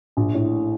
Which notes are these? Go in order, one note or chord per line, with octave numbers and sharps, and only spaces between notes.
A#1
A2